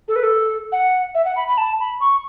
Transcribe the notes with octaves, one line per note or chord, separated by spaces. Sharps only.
A4
B4
A4
F#5
E5
F#5
B5
B5
A5
B5
C#6